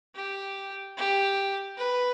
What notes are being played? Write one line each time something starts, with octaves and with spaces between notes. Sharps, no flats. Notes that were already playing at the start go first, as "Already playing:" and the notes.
G4
G4
B4